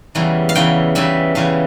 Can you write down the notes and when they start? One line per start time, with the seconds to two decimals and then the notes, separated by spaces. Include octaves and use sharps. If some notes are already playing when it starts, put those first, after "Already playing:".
0.15 E2 C#3 E3 G3
0.49 F5
0.55 E2 C#3 E3 G3 G5
0.95 E2 C#3 E3 G3 E5
1.35 E2 C#3 E3 G3 F5